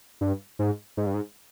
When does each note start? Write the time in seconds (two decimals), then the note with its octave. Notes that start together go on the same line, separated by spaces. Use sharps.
0.21 G2
0.59 G#2
0.97 G#2
1.06 G2
1.14 G#2